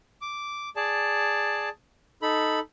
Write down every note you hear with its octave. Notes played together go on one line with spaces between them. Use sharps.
D6
G#4 D5 A5
D#4 A4 B5